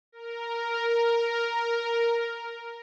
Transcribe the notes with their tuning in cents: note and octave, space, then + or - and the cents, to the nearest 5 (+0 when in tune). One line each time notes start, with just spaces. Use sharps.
A#4 +0